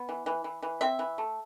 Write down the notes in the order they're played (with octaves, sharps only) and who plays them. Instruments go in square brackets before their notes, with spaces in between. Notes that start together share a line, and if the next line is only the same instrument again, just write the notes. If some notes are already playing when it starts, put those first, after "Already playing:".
Already playing: [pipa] B3
E3
E3
E3
E3
C4 E5
E3
A3